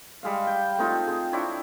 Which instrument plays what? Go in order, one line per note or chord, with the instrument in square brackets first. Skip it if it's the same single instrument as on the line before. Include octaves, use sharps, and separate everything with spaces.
[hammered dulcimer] G3 G#3 F5
G5
A3 C4 D#4 F4
C4 G#4
C4 D4 E4 C#5